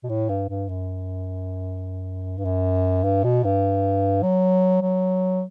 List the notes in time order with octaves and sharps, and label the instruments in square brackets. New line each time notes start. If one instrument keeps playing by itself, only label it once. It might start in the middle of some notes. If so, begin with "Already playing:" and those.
[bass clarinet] B2
A2
G2
G2
F#2
G2
F#2
G2
B2
G2
F#3
F#3